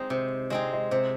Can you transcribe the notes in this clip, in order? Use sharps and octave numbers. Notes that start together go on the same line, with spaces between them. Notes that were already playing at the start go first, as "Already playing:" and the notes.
Already playing: G#3 C4 D#4 G#4 C5
C3 C5
G#3 C4 D#4 G#4 D#5
D#5
C3 C5